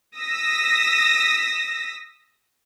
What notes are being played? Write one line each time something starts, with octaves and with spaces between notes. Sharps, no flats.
D#6 E6 A#6 B6